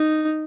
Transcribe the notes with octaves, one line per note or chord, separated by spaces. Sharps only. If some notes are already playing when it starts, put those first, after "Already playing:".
Already playing: D#4